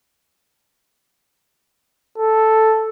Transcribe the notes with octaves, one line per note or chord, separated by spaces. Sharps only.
A4